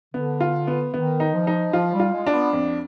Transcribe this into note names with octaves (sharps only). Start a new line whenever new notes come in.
D3 B3
F4
B3
D#3 B3
D#4
F3
D#4
F3 F4
G3
F4
G#3
D4
B3
F2